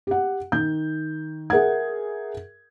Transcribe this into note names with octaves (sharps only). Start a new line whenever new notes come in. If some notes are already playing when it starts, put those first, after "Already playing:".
G4 F#5
D#3 G6
G#4 A#4 E5 F#5 G#6